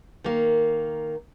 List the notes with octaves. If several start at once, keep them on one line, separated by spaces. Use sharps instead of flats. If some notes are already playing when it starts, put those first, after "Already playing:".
D#3 A#3